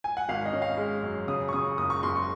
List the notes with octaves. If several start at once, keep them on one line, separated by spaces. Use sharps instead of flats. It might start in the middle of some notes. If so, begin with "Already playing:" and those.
G#5
F#5
G#1 F5
D#5
C#4
F5
G#3
F#2
C#3 D#6
C#6
C#3 D#6
F#1 D#6
C#6
F#1 C6
C#6